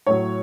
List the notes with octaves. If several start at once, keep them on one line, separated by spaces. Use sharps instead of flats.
A2 F#3 C#5